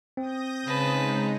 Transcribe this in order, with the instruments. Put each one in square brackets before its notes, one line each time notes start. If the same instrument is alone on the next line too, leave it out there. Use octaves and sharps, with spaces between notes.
[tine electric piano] C4 [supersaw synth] D#6 G6 A#6
[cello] C#3 [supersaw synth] G#3 D#4 [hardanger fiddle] B4 A5